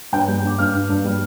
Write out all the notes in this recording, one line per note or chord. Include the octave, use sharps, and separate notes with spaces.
G2 G5 G6
G3
G2 D6
G2 F5 F6
G2
G2
G3